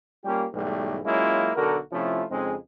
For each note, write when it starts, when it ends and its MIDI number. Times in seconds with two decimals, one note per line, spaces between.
0.24 0.45 55
0.24 0.45 58
0.24 0.45 61
0.24 0.45 65
0.24 0.45 67
0.53 1.00 35
0.53 1.00 44
0.53 1.00 47
0.53 1.00 52
0.53 1.00 55
0.53 1.00 57
1.05 1.51 54
1.05 1.51 56
1.05 1.51 58
1.05 1.51 61
1.05 1.51 64
1.05 1.51 65
1.56 1.78 35
1.56 1.78 50
1.56 1.78 66
1.56 1.78 69
1.56 1.78 70
1.92 2.23 48
1.92 2.23 53
1.92 2.23 57
1.92 2.23 61
1.92 2.23 64
1.92 2.23 65
2.30 2.55 41
2.30 2.55 49
2.30 2.55 56
2.30 2.55 60
2.30 2.55 63
2.30 2.55 68